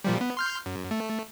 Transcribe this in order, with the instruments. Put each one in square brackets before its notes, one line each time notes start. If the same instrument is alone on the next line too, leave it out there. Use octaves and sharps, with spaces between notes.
[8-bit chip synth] A#2 F3 G3
B3
C6 F6 G6
F#2
A3